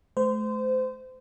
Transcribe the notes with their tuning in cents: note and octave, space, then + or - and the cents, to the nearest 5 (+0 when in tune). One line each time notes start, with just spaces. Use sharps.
A3 -40 C5 -25